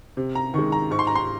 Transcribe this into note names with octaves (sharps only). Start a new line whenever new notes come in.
C3
A#5
D#3 G#3 C#6
A#5
G#2 C#6
C6
A#5
C6